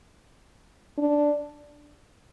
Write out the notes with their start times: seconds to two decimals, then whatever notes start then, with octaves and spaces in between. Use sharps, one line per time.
0.98 D4